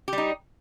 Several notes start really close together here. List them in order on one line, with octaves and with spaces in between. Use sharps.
G4 G3 D#4